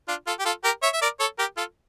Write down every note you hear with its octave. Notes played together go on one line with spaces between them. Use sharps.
D4 F4
F4 A4
G4
F4 A4
G4 A#4
C#5 E5
E5
A#4 D5
A4 C#5
G4 A#4
F4 A4